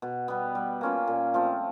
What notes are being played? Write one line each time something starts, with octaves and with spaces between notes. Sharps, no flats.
B2
G3 B3
G3
A#3 C#4 F4
A#2
F3 A3 C4